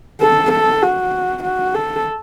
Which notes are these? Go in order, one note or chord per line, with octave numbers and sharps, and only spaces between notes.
A4
A4
F#4
F#4
A4